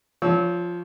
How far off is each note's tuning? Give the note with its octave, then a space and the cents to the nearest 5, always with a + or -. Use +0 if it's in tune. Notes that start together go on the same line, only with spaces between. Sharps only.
F3 +0 C#5 +25 E6 -30